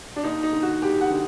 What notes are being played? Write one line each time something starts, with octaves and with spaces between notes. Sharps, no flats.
D4
D#2 D#4
D#4
D3
F#4
D#2 G4
F#5
D3